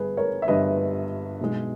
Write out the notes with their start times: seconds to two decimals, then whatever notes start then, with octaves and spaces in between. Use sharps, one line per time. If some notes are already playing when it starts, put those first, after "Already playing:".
Already playing: G1 G2 G3 G#4 B4
0.17 A#4 C#5
0.42 E5
0.48 G1 G2 G3 B4 D#5
1.41 B1 B2 G#3